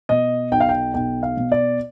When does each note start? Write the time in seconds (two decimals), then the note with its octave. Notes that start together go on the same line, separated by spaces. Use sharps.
0.09 B2 D#5
0.51 B1 G5
0.60 F5
0.69 G5
0.94 B1 G5
1.23 F5
1.37 B2
1.52 D5